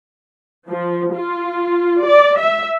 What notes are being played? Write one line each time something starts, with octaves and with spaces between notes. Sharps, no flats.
F3
F4
D5
E5